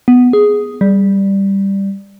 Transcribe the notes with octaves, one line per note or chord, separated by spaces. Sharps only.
B3
G#4
G3